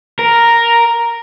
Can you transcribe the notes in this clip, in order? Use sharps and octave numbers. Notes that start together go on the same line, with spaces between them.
A#4